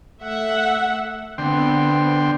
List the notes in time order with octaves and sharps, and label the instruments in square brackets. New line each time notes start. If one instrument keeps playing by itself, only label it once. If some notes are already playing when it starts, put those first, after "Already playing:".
[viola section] A3 E5 F#5
[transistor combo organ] D3 G5 C6 [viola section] B3 C4